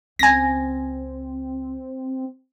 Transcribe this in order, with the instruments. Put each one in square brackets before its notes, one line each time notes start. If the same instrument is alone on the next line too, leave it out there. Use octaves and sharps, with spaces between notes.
[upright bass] C#2 [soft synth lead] C4 [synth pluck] G#5 A#6